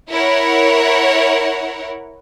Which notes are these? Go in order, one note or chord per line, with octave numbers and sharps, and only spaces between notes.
E4 A#4 C#5 F#5